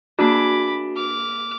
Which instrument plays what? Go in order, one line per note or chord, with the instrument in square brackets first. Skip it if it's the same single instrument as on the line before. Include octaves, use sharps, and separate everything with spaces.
[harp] A#3 G#4 E5 [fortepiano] D4 [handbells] F#4 [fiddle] B5 D6
[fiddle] D6 F6